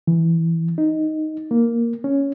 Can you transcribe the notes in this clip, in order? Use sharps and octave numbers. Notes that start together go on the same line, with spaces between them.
E3
D#4
A#3
C#4